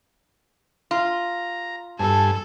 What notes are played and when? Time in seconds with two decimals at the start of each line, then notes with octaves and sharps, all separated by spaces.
0.91 F4 A#5
1.99 G2 A4 G#5 A5